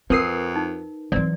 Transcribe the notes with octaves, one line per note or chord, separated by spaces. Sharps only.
F2 C4 F4 A#4 B4 D#6 C7
D#4
E3 F#3 C4 D5